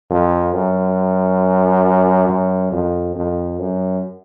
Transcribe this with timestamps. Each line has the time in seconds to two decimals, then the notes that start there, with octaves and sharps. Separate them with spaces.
0.10 F2
0.54 F#2
2.28 F#2
2.72 F2
3.15 F2
3.59 F#2